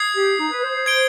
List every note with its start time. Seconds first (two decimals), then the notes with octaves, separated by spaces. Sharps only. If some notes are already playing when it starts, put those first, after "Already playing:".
Already playing: D#6 G#6 C7
0.15 G4
0.39 D#4
0.51 B4
0.63 C5
0.74 C5
0.86 C5 G#6 D7 G7